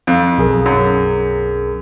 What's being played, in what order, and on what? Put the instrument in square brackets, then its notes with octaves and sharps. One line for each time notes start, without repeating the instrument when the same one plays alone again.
[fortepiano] F2
[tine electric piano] B1 G#4 A#4
[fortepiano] F#2